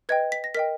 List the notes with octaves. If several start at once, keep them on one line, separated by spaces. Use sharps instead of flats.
B4 D#5 G5 G#6
B6
A#6
A#4 D#5 G5 B6